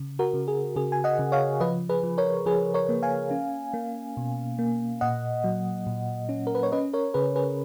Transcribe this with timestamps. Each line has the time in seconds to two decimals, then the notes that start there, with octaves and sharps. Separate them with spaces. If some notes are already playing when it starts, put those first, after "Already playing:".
Already playing: C#3
0.19 F#4 A#4
0.34 C#3
0.48 G#4
0.76 C#3 G#4
0.92 G#5
1.04 D#5 F#5
1.19 C#3
1.32 C#5 F5
1.60 F3 B4 D#5
1.89 G#4 B4
2.03 F3
2.18 A#4 C#5
2.46 F3 G#4 B4
2.74 A#4 C#5
2.89 A#3
3.02 F5 G#5
3.31 C#4
3.74 A#3
4.17 B2
4.59 A#3
5.01 A#2 D#5 F#5
5.44 F#3
5.87 A#2
6.29 C#4
6.47 A#4
6.55 B4
6.63 C#5
6.72 C#4 B4 D#5
6.93 A#4 C#5
7.14 C#3 G#4 B4
7.36 G#4 B4